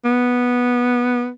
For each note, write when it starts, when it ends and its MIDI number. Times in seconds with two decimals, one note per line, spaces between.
0.04 1.29 59